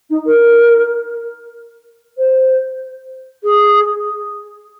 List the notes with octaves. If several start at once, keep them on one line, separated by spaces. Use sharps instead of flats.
D#4
A#4
C5
G#4